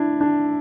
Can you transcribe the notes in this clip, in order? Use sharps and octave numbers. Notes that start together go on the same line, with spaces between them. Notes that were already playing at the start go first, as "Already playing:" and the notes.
Already playing: D4 E4
D4